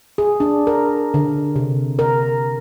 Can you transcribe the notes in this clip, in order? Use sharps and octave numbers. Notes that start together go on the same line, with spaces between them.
G#4
D4
A#4
D3
C3
A#4